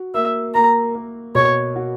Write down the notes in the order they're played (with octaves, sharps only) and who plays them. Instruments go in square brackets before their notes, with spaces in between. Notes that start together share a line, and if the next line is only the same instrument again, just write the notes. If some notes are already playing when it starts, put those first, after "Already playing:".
Already playing: [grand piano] F#4
[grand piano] A#3 [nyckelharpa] E5
[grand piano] A#3 [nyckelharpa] A#5
[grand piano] A#3
[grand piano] B2 [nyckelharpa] C#5
[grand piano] F#4